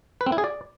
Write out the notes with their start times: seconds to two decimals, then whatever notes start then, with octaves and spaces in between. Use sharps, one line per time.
0.21 B4
0.26 C4
0.32 E4
0.38 G#4
0.44 D5